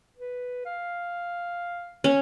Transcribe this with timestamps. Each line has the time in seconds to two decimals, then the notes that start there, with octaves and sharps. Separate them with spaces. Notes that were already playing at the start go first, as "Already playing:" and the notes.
0.17 B4
0.66 F5
2.04 C#4